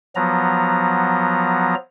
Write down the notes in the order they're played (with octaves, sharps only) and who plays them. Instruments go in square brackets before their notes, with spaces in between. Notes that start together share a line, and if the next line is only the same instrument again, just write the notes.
[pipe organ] F3 F#3 B3 A#5